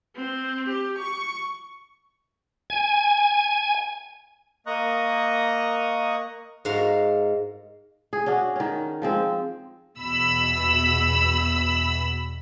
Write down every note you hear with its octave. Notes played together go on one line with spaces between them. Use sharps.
C4
G4
C#6
G#5
A#3 D#5 A#5 C#6 D#6 F#6
G#2 F#4 A#4 F5
G#4
C#4 D4 F#4 G#4
D#3 C#4
F3 G#3 C4
E2 B2 B5 E6